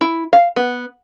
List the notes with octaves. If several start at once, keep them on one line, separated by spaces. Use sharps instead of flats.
E4
F5
B3